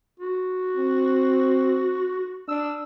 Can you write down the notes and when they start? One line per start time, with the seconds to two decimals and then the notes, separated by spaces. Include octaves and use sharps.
0.20 F#4
0.77 C4
2.48 D4 E6